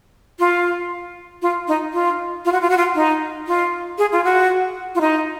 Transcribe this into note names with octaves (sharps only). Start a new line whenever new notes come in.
F4
F4
D#4
F4
F4
F#4
F4
F#4
F4
D#4
F4
G#4
F4
F#4
F4
D#4